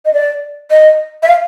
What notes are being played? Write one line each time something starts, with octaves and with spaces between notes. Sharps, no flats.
D#5
D5
D#5
E5
F5